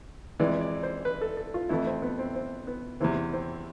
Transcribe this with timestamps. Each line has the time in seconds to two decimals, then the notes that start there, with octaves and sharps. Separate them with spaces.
0.40 F2 E3 G#3 D5
0.61 D5
0.83 C5
1.05 B4
1.21 A4
1.37 A4
1.54 F4
1.69 F2 E3 A3 E4
1.87 C4
2.02 B3
2.19 C4
2.36 C4
2.67 B3
3.00 E2 C3 E3 C4
3.33 C4